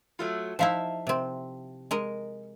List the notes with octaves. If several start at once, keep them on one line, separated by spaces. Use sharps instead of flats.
F#3 A3 F4
F3 D#4 E4 E5 F5 A5
C3 C4
G#3 A#4 D#5